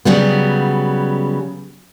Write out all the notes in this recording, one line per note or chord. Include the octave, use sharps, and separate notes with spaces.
C#3 F#3 G3 B3